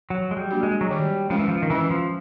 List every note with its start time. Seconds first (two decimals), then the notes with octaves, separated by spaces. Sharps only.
0.10 F3 F#3
0.31 G#3
0.37 G3
0.50 A#3 D4 F#4
0.63 G#3
0.81 F#3
0.90 D#3 G3
1.30 F3 G#3 C#4
1.39 E3
1.48 F3
1.62 D#3
1.70 E3 C#4
1.91 F3